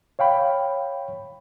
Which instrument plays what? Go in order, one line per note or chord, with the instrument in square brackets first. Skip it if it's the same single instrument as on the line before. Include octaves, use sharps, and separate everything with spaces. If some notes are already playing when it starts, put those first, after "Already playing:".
[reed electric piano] C#5 F5 G5 B5